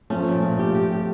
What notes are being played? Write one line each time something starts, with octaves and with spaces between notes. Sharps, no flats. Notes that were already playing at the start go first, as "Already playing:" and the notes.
F3 A3 C#4
A#2
A#2
G4
G4
G4